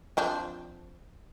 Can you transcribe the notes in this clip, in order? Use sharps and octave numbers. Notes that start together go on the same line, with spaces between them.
F3 C4 D4